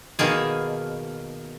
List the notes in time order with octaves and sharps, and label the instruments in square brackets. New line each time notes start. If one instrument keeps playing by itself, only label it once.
[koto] B2 D#3 A#3 G#4